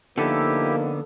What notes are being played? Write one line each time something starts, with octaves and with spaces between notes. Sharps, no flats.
D3 F3 A#3 B3 D#4 E4 G4 A4